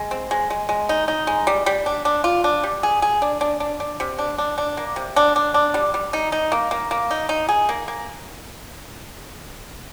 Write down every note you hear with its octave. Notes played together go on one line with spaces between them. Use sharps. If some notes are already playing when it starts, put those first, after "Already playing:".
Already playing: G#3
C4
G#3
G#3
G#3
D#4
D#4
G#3
G3
G3
D4
D4
F4
D4
G3
G#4
G#4
D4
D4
D4
D4
C3
D4
D4
D4
A#3
C3
D4
D4
D4
G3
G3
D#4
D#4
A#3
A#3
A#3
D#4
D#4
G#4
A#3
A#3